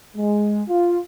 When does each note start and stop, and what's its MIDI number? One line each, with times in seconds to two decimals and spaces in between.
0.17 0.63 56
0.69 0.98 65